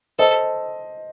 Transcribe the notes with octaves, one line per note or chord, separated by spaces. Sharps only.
A4 C5 D#5